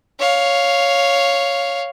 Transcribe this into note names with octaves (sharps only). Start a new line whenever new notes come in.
C#5 F5